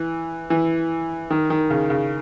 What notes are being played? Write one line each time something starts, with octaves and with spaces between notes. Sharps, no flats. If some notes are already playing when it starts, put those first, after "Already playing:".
Already playing: E3
E3
D#3
D#3
C#3
C#3